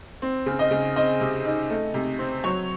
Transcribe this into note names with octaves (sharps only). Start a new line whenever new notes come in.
C4
C#3
D#5
C#3
C4 D#5
C3
D#4
A3
C3
C4
F#3 C#5